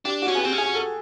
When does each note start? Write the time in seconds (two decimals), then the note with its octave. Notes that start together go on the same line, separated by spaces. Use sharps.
0.05 D4 G4
0.22 F#4
0.28 C#4
0.35 B3 G#4
0.40 C4 G4
0.52 C#4
0.58 G#4
0.75 A4